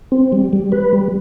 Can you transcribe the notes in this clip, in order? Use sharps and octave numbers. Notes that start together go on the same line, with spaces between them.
C4
G3
G3
B4
G3